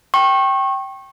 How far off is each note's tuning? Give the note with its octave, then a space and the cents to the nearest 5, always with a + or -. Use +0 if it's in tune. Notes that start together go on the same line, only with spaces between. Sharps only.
G5 -10 C#6 -30